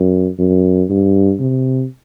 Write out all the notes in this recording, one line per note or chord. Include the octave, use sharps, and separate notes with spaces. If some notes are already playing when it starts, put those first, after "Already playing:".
Already playing: F#2
F#2
G2
C3